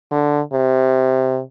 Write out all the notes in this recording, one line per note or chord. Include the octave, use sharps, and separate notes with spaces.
D3
C3